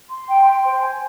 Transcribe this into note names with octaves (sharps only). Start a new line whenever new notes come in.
C6
G5
C6
C5
G#5